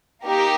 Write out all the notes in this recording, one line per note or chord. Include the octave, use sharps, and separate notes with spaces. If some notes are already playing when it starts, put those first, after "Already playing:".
A#3 D#4 G4 A#4